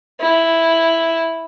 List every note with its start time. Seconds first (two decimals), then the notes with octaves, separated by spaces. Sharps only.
0.20 E4